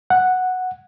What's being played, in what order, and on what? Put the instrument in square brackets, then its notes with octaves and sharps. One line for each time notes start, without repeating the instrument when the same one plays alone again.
[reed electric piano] F#5